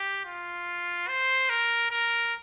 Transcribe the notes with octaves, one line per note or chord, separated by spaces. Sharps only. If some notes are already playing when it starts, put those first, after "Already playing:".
Already playing: G4
F4
C5
A#4
A#4